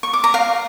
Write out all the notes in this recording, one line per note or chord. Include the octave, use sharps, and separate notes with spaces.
C#6
D6
A#5
F5